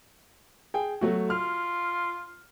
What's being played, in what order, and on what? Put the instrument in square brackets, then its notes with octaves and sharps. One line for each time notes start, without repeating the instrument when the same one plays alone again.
[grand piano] G#4 G5
F#3 A3 F#4
[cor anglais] F4 [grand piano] F6